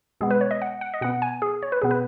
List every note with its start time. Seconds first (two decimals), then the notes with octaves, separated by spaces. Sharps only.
0.21 B2 G#3 B3 G#4
0.31 B4
0.41 C#5
0.51 D#5
0.62 F#5
0.81 F#5
0.94 D#5
1.01 B2 B3 F#5
1.22 G#5
1.42 G#4
1.63 C#5
1.72 B4
1.82 B2 B3 G#4
1.91 B4